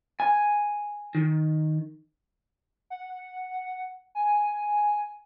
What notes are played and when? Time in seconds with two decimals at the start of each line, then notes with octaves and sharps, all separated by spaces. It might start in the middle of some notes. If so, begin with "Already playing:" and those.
0.20 G#5
1.15 D#3
2.90 F#5
4.15 G#5